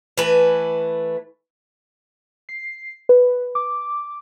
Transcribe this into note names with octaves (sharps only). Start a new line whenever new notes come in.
E3 A3 B4
C7
B4
D6